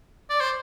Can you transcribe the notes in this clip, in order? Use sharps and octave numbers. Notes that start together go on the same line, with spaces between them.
D5
C5